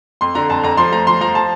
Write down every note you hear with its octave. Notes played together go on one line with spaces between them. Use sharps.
F2 C6
D3 A#5
F2 A5
F2 A#5
F3 C6
A3 A#5
F3 C6
F3 A#5
A5